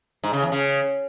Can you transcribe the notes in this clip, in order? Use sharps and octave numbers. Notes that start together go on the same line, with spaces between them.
G#2
C#3
E2
C#3